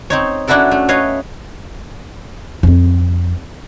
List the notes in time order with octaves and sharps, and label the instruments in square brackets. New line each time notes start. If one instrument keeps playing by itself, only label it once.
[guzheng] C4 D#4 C#5
C#4 D4 E4 F#4 A4 A#4
A3
B4 C#5 D#5 F5
[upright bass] F2 C4